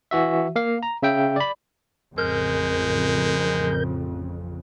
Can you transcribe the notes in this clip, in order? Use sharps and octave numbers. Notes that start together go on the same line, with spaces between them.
E3 F#4 E5
A#3 F5
A#5
C#3 E5 G5
D5 B5
A1 F2 C#3 G#3 A#4 G6